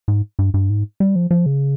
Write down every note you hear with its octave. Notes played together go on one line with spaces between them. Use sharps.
G#2
G2
G2
G#2
G3
F3
F3
C#3